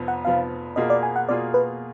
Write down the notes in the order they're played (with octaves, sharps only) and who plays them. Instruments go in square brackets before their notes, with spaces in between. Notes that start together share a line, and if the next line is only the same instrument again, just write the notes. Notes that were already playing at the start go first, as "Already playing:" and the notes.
Already playing: [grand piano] F1 F2 F3 B3
[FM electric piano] F#5
[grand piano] F1 F2 F3 B3 [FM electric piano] F5
[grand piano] B2 A#3 F4 G#4 [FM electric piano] D#5
[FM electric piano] D5
G#5
F#5
[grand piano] B2 A#3 F4 G#4 [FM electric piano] D5
[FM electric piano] B4